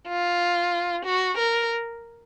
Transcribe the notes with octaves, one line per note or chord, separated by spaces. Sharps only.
F4
F#4
A#4